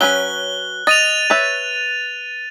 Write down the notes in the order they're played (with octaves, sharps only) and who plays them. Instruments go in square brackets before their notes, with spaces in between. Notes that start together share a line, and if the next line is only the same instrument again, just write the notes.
[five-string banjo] F#3 C#4 B4 [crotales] F#6 G7
[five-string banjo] D#5 [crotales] A6 D#7 F7
[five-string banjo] B4 C#5 E5